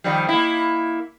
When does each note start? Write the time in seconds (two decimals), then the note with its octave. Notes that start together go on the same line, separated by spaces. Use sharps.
0.04 D#3 F3 G3
0.28 A#3 E4